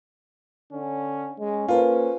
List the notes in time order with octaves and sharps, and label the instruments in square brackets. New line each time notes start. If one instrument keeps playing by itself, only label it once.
[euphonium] D3 [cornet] C#4
[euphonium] G#3 [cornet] C#4
[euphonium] A#3 [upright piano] F4 [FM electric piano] A4 B4 C5